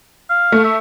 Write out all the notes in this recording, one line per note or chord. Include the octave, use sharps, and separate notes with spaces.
F5
A3
E5